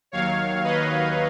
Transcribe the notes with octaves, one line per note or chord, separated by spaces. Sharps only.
D#2 D#3 F#3 C#5 F5
B4 D#5